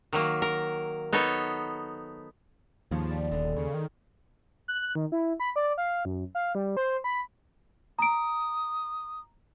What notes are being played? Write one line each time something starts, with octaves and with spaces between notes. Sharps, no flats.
D#3 F#3 A#3
A#4
B3 D#4 A4 C#5
D#2 G#2 F3 B3 C#5
G3 A5
D#1 D3 G#3 B3
C#3 G#4 C#5
D#3
F#6
D#3
E4
B5
D5
F5
F#2
F5
G3
C5
B5
A#5 D#6 D7